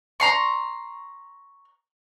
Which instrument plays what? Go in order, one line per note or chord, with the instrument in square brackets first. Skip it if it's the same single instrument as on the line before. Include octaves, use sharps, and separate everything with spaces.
[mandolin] A#5 C6 C#6